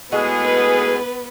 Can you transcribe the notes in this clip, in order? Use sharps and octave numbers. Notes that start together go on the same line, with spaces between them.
A2 G#3 B3 F#4 G#4
B4